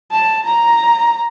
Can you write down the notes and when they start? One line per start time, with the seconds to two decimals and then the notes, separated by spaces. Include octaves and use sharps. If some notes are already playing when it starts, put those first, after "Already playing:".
0.12 A5
0.45 A#5